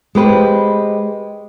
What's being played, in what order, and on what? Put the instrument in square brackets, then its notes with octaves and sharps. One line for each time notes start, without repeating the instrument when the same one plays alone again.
[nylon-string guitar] G#3 G4 B4 C5